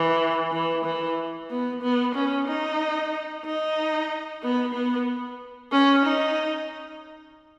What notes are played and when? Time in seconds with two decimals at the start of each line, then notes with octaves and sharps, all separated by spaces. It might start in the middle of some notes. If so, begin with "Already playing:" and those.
Already playing: E3
0.52 E3
0.85 E3
1.50 B3
1.82 B3
2.15 C#4
2.47 D#4
3.45 D#4
4.43 B3
4.75 B3
5.72 C#4
6.05 D#4